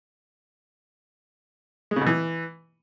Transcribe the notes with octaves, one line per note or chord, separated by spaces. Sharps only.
G#3
C#3
B2
E3